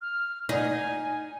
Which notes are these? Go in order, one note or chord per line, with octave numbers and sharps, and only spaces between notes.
F6
D#4 G#5